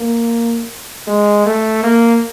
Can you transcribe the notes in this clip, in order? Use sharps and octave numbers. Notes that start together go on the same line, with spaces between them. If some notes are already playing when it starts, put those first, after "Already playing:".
Already playing: A#3
G#3
A3
A#3